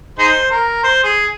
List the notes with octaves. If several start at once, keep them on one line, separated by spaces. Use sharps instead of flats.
D#4 G#4 C5
A#4
C5
G#4